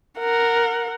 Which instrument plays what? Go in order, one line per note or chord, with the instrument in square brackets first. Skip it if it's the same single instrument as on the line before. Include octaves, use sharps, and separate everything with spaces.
[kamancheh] A#4 F#5